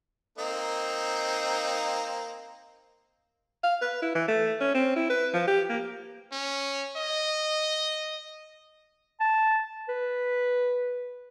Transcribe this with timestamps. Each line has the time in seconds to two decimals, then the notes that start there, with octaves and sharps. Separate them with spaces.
0.38 A#3 C4 D#4
3.63 F5
3.81 B4
4.02 E4
4.15 E3
4.28 A3
4.60 C#4
4.74 C4
4.96 E4
5.09 B4
5.33 F3
5.47 G4
5.69 A#3
6.32 C#4
6.97 D#5
9.20 A5
9.89 B4